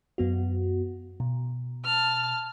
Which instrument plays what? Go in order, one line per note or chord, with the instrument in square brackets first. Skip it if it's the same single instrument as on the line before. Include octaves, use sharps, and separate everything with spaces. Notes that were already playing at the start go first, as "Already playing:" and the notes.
[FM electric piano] F#2 B3 F#4
B2
[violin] A5 F6